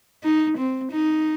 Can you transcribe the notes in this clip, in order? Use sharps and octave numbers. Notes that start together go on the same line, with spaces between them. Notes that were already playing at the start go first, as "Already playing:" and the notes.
D#4
C4
D#4